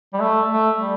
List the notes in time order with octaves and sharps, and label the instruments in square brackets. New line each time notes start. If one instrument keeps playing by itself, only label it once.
[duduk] G3
A3
A3
G3